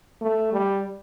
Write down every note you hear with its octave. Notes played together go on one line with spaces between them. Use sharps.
A3
G3